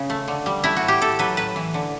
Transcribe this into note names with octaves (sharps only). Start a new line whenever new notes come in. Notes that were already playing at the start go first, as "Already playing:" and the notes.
Already playing: C#3
A3
D3
G3
A3 E4
F#4
A2
G4
A3 A4
F#3 B4
A2 B4
E3
D3